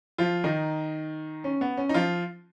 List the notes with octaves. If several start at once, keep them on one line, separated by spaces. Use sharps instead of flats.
F3 F4
D#3 D#4
C#4
B3
C#4
D#4
F3 F4